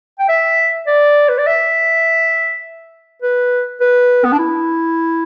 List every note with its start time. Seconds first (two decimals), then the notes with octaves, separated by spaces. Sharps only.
0.19 G5
0.29 E5
0.87 D5
1.29 B4
1.38 D5
1.46 E5
3.22 B4
3.81 B4
4.25 B3
4.32 D4
4.39 E4